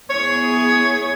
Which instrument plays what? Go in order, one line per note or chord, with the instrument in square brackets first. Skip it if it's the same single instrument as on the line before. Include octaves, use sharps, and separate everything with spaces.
[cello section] B3 E4 G#4 [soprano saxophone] C#5